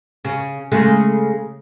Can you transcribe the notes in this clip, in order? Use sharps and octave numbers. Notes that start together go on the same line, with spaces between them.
C#3
C#3 G#3 A3